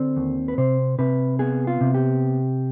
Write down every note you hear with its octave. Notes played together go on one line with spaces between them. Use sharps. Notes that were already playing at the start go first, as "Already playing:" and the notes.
Already playing: D3 C4 D5
D#2
B4
C3 C5
C3 B4
B3 G#4
F4
C3
G4